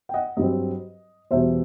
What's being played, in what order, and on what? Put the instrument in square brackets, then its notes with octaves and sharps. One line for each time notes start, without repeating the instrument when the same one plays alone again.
[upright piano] G5
D#5 F#5
G2 F#3 C4 D#5
E2 B2 G3 C5 E5